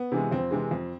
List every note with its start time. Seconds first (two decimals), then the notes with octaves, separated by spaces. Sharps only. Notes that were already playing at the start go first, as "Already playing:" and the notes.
Already playing: B3
0.12 C3 E3 G#3
0.31 F2 C4
0.51 C3 E3 G#3
0.71 F2